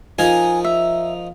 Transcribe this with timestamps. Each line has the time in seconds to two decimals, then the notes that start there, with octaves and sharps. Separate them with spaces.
0.19 F3 D#4 A#4 G#5
0.64 E5